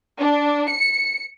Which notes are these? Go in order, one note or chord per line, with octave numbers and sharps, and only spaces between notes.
D4
C#7